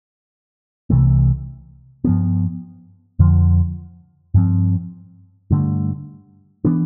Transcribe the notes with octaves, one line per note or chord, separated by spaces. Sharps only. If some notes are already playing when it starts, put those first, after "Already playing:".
C2 C3 E3 A3
G2 F3 B3
F2 D3 F3
G2 F3 C4
G2 D3 A3
E3 B3 D4